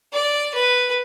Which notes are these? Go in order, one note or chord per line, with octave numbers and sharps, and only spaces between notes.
D5
B4